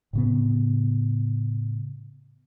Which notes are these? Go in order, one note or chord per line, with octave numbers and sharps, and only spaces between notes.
A2 C#3 B3